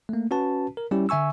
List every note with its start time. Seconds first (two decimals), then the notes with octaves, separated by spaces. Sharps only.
0.09 A3 A#3
0.31 C#4 F#4 B4 A5
0.77 A#4
0.91 G3 C#4 E4 G4
1.09 D3 E5 G#5 C#6 E6